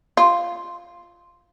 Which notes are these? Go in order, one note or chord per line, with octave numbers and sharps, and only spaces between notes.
F4